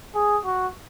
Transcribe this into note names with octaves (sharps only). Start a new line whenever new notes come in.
G#4
F#4